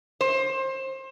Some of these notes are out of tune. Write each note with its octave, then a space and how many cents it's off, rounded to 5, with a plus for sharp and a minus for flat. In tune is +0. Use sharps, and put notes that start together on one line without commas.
C5 +30